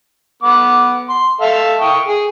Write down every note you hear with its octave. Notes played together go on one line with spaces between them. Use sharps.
B3 D6
C6
A4 E5 F5
G5 C#6 D#6
G#4